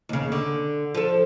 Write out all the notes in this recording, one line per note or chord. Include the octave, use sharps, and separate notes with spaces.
D#2 C#3
D3
F3 A4